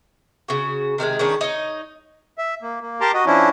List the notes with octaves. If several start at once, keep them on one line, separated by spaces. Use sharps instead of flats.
C#3 F#4
C3 D#3 G3 G#3
D#3 G#3 C#4 D4
D#4 C#5 D#5
E5
A#3
A#3
G4 A#4 A5 A#5 C6 D6
F#4 D#5
F3 C#4 D4 E4